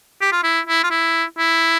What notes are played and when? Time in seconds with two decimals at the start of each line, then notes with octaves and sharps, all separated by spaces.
0.21 G4
0.32 F4
0.43 E4
0.67 E4
0.84 F4
0.91 E4
1.38 E4